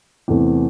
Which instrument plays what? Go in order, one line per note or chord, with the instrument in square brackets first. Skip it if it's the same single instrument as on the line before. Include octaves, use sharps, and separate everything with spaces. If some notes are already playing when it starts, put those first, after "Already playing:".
[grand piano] E2 C3 E3 A3 C4